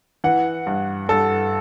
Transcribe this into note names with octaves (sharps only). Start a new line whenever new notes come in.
E3 F#5
G2
G2 A4